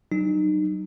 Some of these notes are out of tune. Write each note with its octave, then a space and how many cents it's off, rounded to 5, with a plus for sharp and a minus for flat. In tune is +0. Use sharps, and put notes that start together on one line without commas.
F#3 +35 D#4 -30